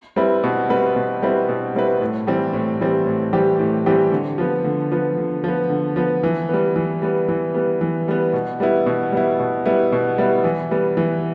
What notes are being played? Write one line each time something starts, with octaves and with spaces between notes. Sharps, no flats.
G3 C4 E4 B4
B2
G3 C4 E4 B4
B2
G3 C4 E4 B4
B2
G3 C4 E4 B4
A2
E3 G3 C4 G4
A2
E3 G3 C4 G4
A2
E3 G3 C4 G4
A2
E3 G3 C4 G4
D3
F3 B3
D3
F3 B3
D3
F3 B3
D3
F3 B3
E3
G3 B3
E3
G3 B3
E3
G3 B3
E3
G3 B3
B2
G3 B3 E4
B2
G3 B3 E4
B2
G3 B3 E4
B2
G3 B3 E4
E3
G3 B3
E3